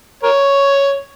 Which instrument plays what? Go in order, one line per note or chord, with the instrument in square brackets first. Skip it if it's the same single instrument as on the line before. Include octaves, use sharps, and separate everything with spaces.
[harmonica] A#4 C#5